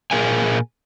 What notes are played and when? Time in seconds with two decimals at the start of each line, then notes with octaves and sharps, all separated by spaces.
0.11 A#2 G#4 A#4 F5 G#5